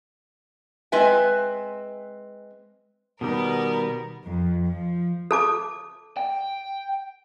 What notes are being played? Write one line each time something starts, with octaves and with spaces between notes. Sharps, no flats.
G#3 C4 B4 E5 G#5
B2 D#3 G3 B3 A#4
F2
F3
A4 A5 D6
G5